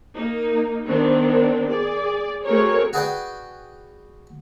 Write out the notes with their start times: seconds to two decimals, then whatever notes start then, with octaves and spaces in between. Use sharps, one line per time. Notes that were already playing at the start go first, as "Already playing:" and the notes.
0.15 A#3 D#4
0.86 D#3 B3 C4 D4
1.69 G#4 D5
2.44 A3 C4 F#4 G#4 A#4 C#5
2.93 F#4 G#4 B4 D5 F#5 G5